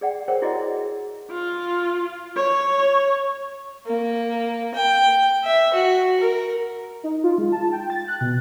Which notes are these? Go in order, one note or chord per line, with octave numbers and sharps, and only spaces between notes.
G#4 D5 F#5 G5
G#4 A#4 C5 C#5 F#5 G5
E4 F#4 G#4 D5 D#5
F4
C#5
A#3
G5
E5
F#4
A#4
D#4
F4
G#3
A5
G5
A6
F#6
B2